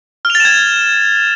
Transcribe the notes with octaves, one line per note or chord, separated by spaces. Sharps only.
F6
F7
A6
E7
G#6